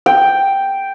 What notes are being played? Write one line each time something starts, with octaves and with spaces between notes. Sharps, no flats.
G5